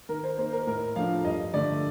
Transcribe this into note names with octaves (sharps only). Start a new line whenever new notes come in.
D#3 A#4
C5
A#3 D#4 C5
A#4
A2 A#4
F3 A3 D4 F5
G2 D#5
D3 A3 D5